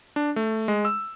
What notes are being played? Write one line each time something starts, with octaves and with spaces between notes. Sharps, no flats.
D4
A3
G#3
E6